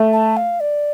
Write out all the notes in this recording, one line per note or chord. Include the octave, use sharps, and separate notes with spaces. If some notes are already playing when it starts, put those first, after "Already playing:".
Already playing: A3
A5
F5
D5